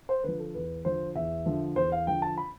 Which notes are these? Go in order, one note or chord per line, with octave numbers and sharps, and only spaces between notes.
C5
D3 F3 B4
A4
E2 B4
D3 F3 C5
E2 E5
D3 F3
E2 C5
F5
D3 F3 G5
A5
B5